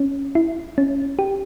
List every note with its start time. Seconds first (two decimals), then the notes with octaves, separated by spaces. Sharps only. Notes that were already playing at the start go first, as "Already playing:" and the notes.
Already playing: C#4
0.35 E4
0.78 C#4
1.19 G4